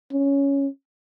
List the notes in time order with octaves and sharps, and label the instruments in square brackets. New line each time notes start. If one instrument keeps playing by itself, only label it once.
[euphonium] C#4